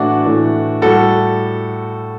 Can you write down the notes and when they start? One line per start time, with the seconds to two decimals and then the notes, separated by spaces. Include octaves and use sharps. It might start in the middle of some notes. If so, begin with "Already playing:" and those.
Already playing: A2 E3 A3 D4 F#4
0.26 A2 E3 A3
0.82 A2 G3 F#4 A4